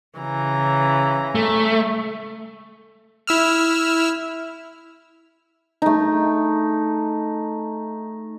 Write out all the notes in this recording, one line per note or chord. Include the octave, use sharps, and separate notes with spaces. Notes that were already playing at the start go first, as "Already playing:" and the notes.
C#3 E3 A#5
A3
E4 E6 F6
A3 D#4